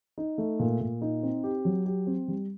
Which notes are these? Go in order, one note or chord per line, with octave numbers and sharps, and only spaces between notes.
D#4
A3
A#2
A#2
D#4
C4
G4
F#3
G4
C4
G3